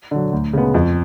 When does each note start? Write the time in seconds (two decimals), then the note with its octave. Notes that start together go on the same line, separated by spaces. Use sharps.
0.11 D3 F#3
0.33 D2
0.53 C#3 G#3 B3
0.74 F2